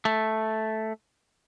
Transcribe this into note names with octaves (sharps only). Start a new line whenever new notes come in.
A3